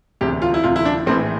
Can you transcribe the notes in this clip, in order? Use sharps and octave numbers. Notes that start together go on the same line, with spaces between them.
E1 D2 C3 G4
F4
E4
E1 D2 C3 F4
E4
D4
A#1 A2 E3 C4